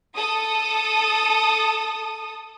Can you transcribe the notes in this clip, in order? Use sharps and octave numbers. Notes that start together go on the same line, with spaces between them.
A4 D#6